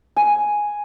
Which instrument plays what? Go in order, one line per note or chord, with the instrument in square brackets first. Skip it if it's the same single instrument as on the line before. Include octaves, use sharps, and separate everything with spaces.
[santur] G#5